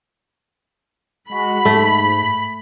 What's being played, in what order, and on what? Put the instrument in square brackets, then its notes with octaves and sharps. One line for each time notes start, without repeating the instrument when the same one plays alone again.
[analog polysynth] G#3 F#4 [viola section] B5
[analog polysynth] G#2 [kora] A3